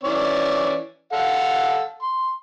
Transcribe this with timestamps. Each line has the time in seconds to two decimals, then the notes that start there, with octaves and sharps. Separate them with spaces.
0.03 E3 C#4 D5
1.13 A4 F5 F#5
2.02 C6